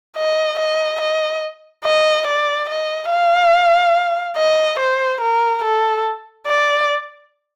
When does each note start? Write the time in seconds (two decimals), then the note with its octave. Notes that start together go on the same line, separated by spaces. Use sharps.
0.17 D#5
0.59 D#5
1.01 D#5
1.84 D#5
2.27 D5
2.69 D#5
3.10 F5
4.37 D#5
4.79 C5
5.21 A#4
5.63 A4
6.47 D5